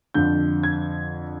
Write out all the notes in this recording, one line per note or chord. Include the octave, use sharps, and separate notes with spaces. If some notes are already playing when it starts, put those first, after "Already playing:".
F2 D3 G6
G#6